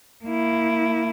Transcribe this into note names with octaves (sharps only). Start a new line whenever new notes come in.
A#3 E4